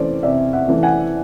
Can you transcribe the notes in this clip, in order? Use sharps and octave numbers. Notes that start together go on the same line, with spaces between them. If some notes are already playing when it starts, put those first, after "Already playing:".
Already playing: C3 E3 A3 C#4 C5 D5
C3 D5 E5
E5 F#5
E3 A3 C#4
F#5 G#5